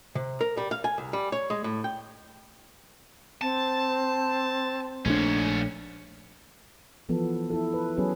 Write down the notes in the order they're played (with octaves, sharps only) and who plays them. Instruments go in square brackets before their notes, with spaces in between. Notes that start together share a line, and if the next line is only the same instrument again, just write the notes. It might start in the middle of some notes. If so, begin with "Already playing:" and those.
[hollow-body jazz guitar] C3
A#4
G3
F5
G#5
C2
G3
C#5
G#3
A2
G5
[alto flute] C4 [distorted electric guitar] A5
[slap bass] A#1 A3 D4 [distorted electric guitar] G#2 C#4
[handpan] E3 F3 B3 A4
E4 A4
B4
F#3 B3 C#4 G#4 B4